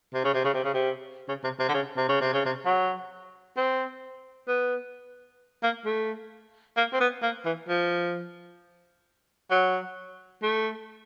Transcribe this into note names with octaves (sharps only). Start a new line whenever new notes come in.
C3
C#3
C3
C#3
C3
C#3
C3
C#3
C3
C3
D3
C#3
C3
C#3
C3
C#3
C3
F#3
C4
B3
A#3
A3
A#3
C4
B3
A#3
E3
F3
F#3
A3